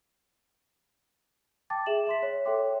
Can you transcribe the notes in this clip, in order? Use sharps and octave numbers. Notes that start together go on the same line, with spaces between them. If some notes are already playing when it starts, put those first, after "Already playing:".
G5 A5 D6 A6
G#4 E5 E7 F#7
E5 C6 B6
C#5
A4 C#5 E5 G5 C6 D6